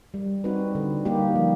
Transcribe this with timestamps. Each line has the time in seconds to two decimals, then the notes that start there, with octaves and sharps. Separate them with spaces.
0.14 G3
0.44 C4 D#4 F#4 B4
0.75 D3
1.05 G3 A#3 D#4 G4
1.36 F3